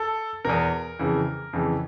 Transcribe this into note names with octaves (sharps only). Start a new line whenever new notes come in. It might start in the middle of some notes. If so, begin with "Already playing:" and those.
Already playing: A4
E2 B2 A#4
F2 C#3 E3
F2 C#3 E3